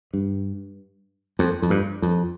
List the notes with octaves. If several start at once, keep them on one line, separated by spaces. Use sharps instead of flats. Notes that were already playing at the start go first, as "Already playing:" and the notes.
G2
F2
F2
G2
F2